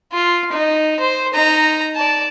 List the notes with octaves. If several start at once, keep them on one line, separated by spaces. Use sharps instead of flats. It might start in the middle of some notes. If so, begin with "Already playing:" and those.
F4
D#4
C5
D#4 A#5
D5 A5